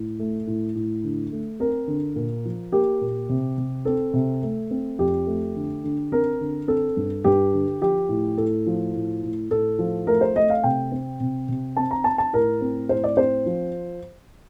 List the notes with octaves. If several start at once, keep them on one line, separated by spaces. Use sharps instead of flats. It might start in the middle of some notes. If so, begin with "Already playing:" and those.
Already playing: A2
A3
A2
A2
D3
A3
C4 A#4
D3
A#2
F3
A#3 G4
A#2
C3
C3
C4 A4
C3
A3
C4
F2 G4
A3
D3
D3
C4 A#4
D3
C4 A4
G2
G2 G4
D3
F3 G4
A2
A2 A4
F3
A2
A2
A2 A4
F3
A3 A#4
C5
A3 D#5
F5
C3 G5
C4
C3
C3
C4 A5
A#5
C4 A5
A5
A2 A#4
C4
A2 C5
D5
C4 C5
F3